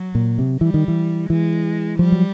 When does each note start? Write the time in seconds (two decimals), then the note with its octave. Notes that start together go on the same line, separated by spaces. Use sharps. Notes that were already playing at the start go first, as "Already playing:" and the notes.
Already playing: F#3
0.15 A#2
0.38 C3
0.61 E3 G3
0.74 D#3
0.88 E3
1.30 E3 G#3
1.99 F3 G3
2.12 F#3